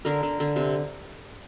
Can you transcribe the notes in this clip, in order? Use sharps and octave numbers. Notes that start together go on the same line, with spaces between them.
D3 A#4
D3
D3
C3